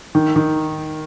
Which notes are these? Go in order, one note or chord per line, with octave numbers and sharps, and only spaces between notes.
D#3
D#3